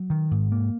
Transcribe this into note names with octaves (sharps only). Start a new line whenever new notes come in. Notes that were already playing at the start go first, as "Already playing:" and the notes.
Already playing: F#3
D#3
G#2
A#3